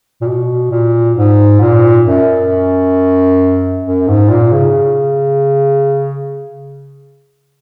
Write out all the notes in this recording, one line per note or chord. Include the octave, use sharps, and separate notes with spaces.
A#2
B2
A#2
G#2
A#2
F#2
F#2
G#2
A#2
C#3